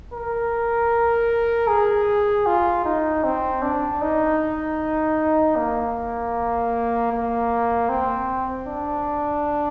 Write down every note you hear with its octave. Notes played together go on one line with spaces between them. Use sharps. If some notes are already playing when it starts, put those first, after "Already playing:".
A#4
G#4
F4
D#4
C4
D4
D#4
A#3
A#3
C4
D4